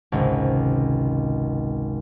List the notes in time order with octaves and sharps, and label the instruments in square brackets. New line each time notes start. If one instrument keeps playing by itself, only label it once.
[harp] G#1 C#2 C3